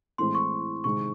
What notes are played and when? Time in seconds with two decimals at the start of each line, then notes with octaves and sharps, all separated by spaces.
0.18 A2 E3 G#3 C4 C6
0.35 C#6
0.84 C3 D#3 G#3 C#6